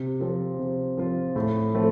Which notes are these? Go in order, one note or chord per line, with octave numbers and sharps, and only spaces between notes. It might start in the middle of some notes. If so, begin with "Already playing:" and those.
Already playing: C3
F3 C4 F4
C3
F3 C4 F4
A2
F3 A3 C4